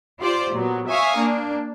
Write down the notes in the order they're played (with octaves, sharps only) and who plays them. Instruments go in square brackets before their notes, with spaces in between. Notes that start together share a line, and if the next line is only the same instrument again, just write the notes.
[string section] F4 G4 C5 D5
A#2 F#3 B3
C#5 E5 F5 G#5 C#6 D#6
A#3 D4